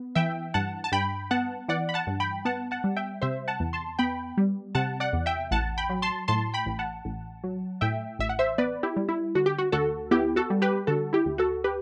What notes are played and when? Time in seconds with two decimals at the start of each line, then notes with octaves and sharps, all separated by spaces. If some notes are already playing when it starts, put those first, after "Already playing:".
Already playing: B3
0.15 E3 E5 G5
0.54 G2 F#5 A5
0.84 A5
0.92 G2 G5 B5
1.31 B3 F#5 A5
1.68 E3 D5 F#5
1.89 B5
1.94 F#5 A5
2.07 G2
2.20 G5 B5
2.45 B3 F#5 A5
2.71 F#5 A5
2.84 G3
2.96 E5 G5
3.22 C3 C5 E5
3.48 F#5 A5
3.60 E2
3.73 A5 C6
3.99 B3 G5 B5
4.38 G3
4.75 C3 F#5 A5
5.00 D5 F#5
5.13 E2
5.26 E5 G5
5.51 A1 F#5 A5
5.78 G5 B5
5.90 F#3
6.02 A5 C6
6.28 A2 A5 C6
6.54 G5 B5
6.66 A1
6.79 F#5 A5
7.05 A1
7.44 F#3
7.81 A2 E5 G5
8.19 A1 E5
8.29 F#5
8.39 C5 E5
8.58 B3 B4 D5
8.83 E4 G4
8.96 G3
9.09 E4
9.35 D3 F#4
9.46 G4
9.58 F#4
9.72 D2 F#4 A4
10.11 B3 E4 G4
10.36 F#4 A4
10.50 G3
10.62 G4 B4
10.87 D3 F#4 A4
11.13 E4 G4
11.26 D2
11.38 F#4 A4
11.64 G4 B4